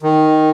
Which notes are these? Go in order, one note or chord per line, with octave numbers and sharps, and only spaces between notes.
D#3